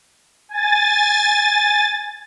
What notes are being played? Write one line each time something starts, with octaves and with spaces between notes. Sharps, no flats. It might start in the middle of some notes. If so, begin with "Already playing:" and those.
G#5 A6